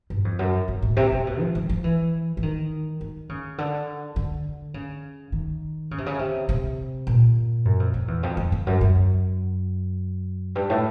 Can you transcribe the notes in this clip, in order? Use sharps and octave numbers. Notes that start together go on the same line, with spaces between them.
G2
F2
F#2
F#2
A2
C3
C3
B2
F3
F3
F3
E3
E3
D#3
D#3
C#3
D3
D3
C#3
D#3
C#3
C3
C#3
C3
C3
A#2
F#2
F2
F2
E2
F2
F2
F2
F#2
F#2
G2
A2